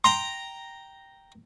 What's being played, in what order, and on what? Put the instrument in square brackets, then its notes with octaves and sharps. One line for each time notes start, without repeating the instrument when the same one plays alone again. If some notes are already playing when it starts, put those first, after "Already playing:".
[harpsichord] G5 A#5 [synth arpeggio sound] C6